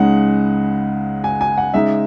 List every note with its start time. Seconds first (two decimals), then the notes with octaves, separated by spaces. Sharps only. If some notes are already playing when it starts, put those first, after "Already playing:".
Already playing: C#2 C#3 G#3 D#4 F#5
1.24 G#5
1.41 G#5
1.58 F#5
1.74 C#3 G#3 D#4 E5